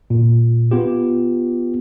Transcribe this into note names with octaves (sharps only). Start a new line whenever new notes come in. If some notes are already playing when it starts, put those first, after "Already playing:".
A#2
B3 F4 G4